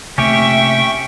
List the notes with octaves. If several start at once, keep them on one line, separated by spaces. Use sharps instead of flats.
C3 A3 A#3 C#4 G4 E5 G5 C#6